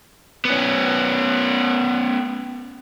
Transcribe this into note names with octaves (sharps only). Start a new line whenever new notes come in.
B3 C#4